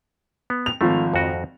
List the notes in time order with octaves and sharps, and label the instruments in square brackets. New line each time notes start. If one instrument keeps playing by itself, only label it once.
[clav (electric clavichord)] B3
[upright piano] F7
[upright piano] G#1 F3 [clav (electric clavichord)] A3
[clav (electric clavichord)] F2 F#4 D#5